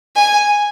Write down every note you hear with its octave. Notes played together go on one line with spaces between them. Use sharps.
G#5